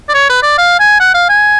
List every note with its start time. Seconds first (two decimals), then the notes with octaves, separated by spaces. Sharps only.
0.09 D5
0.14 C#5
0.30 B4
0.43 D5
0.58 F5
0.80 G#5
1.00 F#5
1.14 F5
1.29 G#5